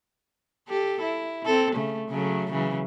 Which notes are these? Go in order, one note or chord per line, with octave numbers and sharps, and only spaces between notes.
G4 A4
E4
C4 A4
C#3 A3
C#3 F#3 A3
C#3 E3 F#3